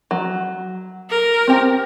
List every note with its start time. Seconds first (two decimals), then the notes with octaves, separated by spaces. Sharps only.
0.11 F#3
1.10 A#4
1.47 C4 G4